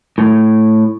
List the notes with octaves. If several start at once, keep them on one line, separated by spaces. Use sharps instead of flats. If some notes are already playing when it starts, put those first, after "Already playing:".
A2